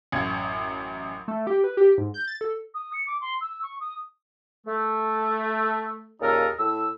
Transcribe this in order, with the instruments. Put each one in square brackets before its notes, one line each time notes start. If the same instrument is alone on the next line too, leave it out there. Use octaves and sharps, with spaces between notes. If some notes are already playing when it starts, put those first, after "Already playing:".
[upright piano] A1 F#2 G#6
[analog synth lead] A3
G4
B4
G4
G#2
G6
A6
A4
[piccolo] D#6
C#7
D6
C6
E6
C#6
D#6
[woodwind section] A3
D#2 A#2 C#3 D#4 A4 A#4
A2 E6